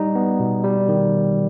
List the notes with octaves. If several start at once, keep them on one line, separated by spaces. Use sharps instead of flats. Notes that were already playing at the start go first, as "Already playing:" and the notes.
Already playing: G3 D#4
B3
B2
G3
D#3